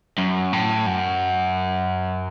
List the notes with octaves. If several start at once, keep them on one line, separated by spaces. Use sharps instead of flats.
F#2
A2
F#2